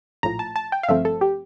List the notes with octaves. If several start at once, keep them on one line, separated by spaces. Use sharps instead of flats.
A#1 A2 F3 A#5
A5
A5
G5
F5
G1 G2 F3 A3 C4 E5
A4
G4